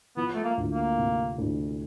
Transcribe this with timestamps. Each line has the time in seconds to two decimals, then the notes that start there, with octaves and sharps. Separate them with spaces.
0.17 F3 B3
0.35 A3
0.44 A#3
0.57 D2
0.70 A#3
0.98 C3
1.38 D2